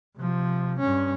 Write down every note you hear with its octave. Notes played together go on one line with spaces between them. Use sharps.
C3 F3
G2 C#4